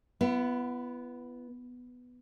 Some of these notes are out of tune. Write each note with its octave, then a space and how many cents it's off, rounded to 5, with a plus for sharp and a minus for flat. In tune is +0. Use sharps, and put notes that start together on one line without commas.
B3 +0 E4 +45